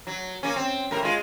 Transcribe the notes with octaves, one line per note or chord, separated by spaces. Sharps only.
F#3
A#3 C#4
C4
A2 A#4
G#3 F4